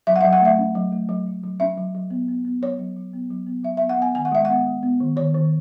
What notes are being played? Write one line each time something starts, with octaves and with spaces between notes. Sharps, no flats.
F#3 E5
F#5
F#3 E5
F#5
A3 E5
C#4
F#3
A3
F#3
F#3
F#3
C#4 E5
F#3
F#3
B3
B3
B3
F#3 C#5
F#3
F#3
B3
F#3
B3
F#3 E5
B3 E5
F#5
B3 G#5
D#3 G#5
F#5
G#3 E5
B3 F#5
G#3
B3
D#3
D#3 C#5
D#3